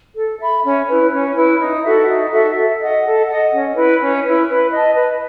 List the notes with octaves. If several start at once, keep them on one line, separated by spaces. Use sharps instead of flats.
A4
E5 B5
C#4
E4 B4
C#4
E4 B4
D#4
F#4 A4 E5
D#4
F#4 A4 E5
A4
D#5 F#5
A4
D#5 F#5
C#4
E4 B4
C#4
E4 B4
B4
D#5 A5
B4